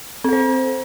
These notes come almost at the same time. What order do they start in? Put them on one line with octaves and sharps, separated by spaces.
C4 A4 C5